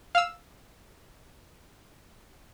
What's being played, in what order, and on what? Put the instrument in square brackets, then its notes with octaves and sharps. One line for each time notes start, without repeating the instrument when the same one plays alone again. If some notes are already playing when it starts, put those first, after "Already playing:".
[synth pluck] F5 E6